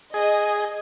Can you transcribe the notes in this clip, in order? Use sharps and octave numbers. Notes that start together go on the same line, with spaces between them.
G#4 D#5